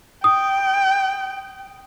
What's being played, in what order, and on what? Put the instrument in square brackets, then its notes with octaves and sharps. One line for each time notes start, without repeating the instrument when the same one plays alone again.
[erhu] G5 [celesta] D#6